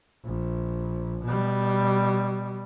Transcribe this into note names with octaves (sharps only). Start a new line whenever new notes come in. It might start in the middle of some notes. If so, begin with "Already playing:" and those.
A#1
B2 G3